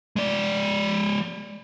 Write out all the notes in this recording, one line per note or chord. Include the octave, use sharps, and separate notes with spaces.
G#3 D5